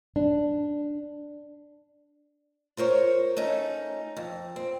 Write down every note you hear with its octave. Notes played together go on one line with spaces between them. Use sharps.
D4
F4 A#4 C5 C#5
A3 C#4 D#4
F2
C4